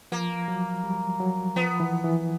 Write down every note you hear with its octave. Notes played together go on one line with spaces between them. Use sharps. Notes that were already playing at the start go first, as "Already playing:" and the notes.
F3 A#3
F#3
G3
F#3
F3 B3
E3
E3